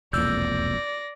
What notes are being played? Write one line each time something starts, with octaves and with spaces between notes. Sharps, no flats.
E1 C2 F2 A#3 D5 E6 G6 A#6